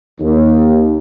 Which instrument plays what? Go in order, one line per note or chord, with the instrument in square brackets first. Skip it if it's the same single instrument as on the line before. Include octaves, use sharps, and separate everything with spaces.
[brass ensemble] D#2